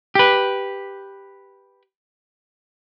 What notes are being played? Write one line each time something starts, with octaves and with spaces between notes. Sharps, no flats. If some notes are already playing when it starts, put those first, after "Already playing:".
G4 B4